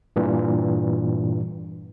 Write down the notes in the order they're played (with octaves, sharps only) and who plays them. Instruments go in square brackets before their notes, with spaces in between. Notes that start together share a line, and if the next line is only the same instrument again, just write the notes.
[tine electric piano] G2 A#2 E3